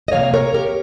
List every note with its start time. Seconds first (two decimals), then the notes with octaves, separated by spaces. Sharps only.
0.08 D#5
0.12 C3 F3 A#3 C#5 F5
0.34 A#4 C#5
0.54 G4 A#4